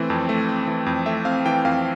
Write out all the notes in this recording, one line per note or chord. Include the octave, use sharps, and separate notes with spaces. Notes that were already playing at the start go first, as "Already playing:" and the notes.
Already playing: E3 A3 C4
F2
A3
C4
E3
F2
A3 E5
C4 F5
E3 G5
F2 F5